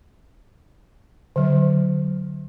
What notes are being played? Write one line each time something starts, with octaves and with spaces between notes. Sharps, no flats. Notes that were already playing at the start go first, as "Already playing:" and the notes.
D3 F#3